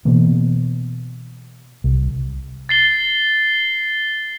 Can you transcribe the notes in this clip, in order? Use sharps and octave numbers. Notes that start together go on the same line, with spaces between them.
B2 E3 A#3 B3
C2
A6 C7 G7